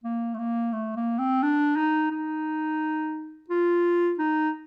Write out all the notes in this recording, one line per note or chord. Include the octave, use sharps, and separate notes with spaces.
A#3
A3
A#3
A3
A#3
C4
D4
D#4
D#4
F4
D#4